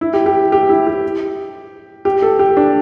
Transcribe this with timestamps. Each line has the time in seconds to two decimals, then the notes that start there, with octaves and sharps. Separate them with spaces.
0.01 E4
0.13 G4
0.26 G4
0.52 G4
0.69 E4
0.87 G4
2.05 G4
2.22 A4
2.39 G4
2.57 D4